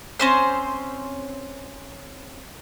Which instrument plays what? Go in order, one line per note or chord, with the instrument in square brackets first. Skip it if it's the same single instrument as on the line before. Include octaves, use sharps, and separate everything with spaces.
[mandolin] C4 C#4 C5